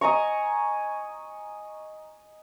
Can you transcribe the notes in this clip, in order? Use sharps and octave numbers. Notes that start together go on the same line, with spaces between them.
D#5 G#5 A#5 C#6